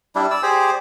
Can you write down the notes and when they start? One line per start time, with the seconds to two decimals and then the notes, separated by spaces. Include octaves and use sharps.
0.15 G3 D4 E4
0.31 D5 E6
0.43 G4 G#4 C5 D5